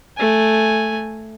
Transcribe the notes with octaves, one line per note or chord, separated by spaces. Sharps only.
A3 G#5